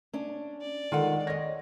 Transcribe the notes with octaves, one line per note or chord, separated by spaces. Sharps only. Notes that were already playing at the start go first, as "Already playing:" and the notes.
C#4 D4
D5
D#3 G#3 F4 A4 F#5
C#5 D#5 A#6